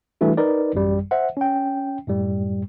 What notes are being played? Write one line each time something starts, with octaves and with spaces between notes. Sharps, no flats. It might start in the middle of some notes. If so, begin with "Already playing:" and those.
E3 G3 A3 D4 F#4
D#4 A#4 B4 D5
A1 F#2 G3
C5 E5 F#5
C#4 G5
F#2 A2 G3